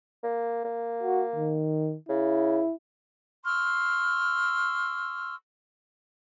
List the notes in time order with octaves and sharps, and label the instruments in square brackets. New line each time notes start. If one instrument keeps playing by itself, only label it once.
[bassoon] A#3
A#3
[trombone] F#4
D#3
[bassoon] C#3 [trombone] E4
[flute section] C6 C#6 E6 F6